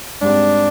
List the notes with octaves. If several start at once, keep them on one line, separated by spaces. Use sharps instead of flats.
G#2 G3 C4 D4